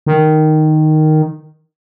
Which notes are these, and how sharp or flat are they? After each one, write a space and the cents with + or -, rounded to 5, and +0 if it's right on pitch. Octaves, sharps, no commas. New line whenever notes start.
D#3 -5